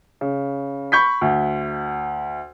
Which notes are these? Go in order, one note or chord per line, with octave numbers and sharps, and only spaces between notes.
C#3
B5 C#6 G6 B6
D2